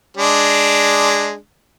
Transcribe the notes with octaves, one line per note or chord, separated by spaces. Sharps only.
G#3 D4